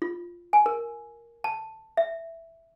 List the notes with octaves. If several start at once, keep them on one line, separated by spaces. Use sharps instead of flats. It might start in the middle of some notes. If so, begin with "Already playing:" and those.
F4
G#5
A#4
A5
E5